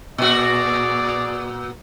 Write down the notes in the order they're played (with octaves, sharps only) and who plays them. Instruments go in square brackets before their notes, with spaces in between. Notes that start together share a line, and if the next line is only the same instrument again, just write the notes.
[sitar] A#2 F#4 [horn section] G#4 D5